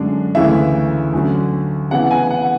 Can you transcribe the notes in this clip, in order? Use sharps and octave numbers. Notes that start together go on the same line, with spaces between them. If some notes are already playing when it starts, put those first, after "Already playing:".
Already playing: F#2 D3 G#3 D4
D2 C#3 E3 A3 E4 E5
D2 D3 F#3 C#4
C#3 E3 B3 E4 F#5
G#5
F#5